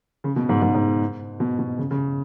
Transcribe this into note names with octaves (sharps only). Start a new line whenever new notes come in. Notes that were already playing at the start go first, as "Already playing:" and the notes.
C#3
B2
G#2
G#2
G#2
B2
B2
C#3
C#3